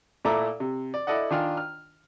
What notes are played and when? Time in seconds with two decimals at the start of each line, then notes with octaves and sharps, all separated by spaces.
0.25 A#2 A3 E4 A4 A#5 D6
0.60 C3
0.94 D5
1.07 E4 A4 D5 D#5 F#5
1.30 D#3 D4 F4 G#5 F6
1.57 F6